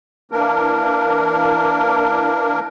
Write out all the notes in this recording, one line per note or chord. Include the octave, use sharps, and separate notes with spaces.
E3 A#3 D4 A#4